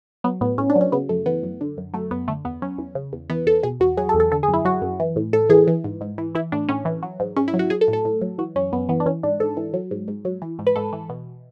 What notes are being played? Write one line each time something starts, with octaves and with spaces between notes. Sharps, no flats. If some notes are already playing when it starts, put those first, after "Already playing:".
F#3 B3
A2 B3
A2 C#4
D4
F#3
C#4
C#3 B3
F#2 A3
E3 B3
F#2
D3
F#2
F#3 A3
F#2 B3
D3 A3
E2 B3
F#3 C#4
E2
C#3
E2
E3 B3
E2 A4
B2 G#4
E2 F#4
F#3 G#4
A4
E2
A4
D3 A4
G#4
F#2
E4
F#3 F#4
F#2
E3
A2
A2 A4
E3 G#4
E3
G#2
G#2
E3
E3 E4
A2 D4
A2 C#4
E3
F#3
G#2
G#2 C#4
E4
F#3
F#4
F#3 G#4
A4
A2
A4
A2
F#3
E3 F#4
F#2 C#4
F#2 B3
E3 B3
D4
E3 C#4
G#2 D4
G#2 A4
E3
F#3
G#2
G#2
F#3
E3
G#2
B4
G#2 A4
E3
B2